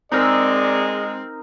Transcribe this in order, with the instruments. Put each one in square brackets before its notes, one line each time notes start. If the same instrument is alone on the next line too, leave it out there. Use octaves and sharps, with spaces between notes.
[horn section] G#3 [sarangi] C4 [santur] D#4 A#4 E6 [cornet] D5